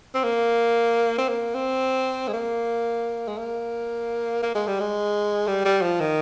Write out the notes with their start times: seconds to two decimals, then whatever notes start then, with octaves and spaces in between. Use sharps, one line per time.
0.14 C4
0.23 A#3
1.18 C4
1.28 A#3
1.54 C4
2.28 G#3
2.33 A#3
3.28 G#3
3.38 A#3
4.43 A#3
4.55 G#3
4.67 G3
4.80 G#3
5.47 G3
5.65 G3
5.82 F3
6.00 D#3